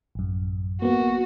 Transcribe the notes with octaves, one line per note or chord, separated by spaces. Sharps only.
A1 F#2
A#3 B3 F#4